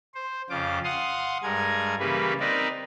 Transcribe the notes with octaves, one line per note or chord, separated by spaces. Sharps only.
C5
F2 C#3 F4 D6
F5 F#5 C6 D#6
G2 G#3 G#4 A#4 G#6
C#3 E3 G3 A#3 B4
C4 D#4 A#4 B4 D5